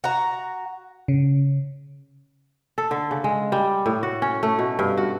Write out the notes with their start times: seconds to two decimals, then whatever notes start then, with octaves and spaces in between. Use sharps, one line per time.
0.04 F#4 A#5
1.08 C#3
2.78 A4
2.91 D3
3.11 C#3
3.24 G#3
3.52 G3
3.86 A2
4.03 F#4
4.22 C#4
4.43 A3
4.59 B2
4.79 G2
4.97 F#4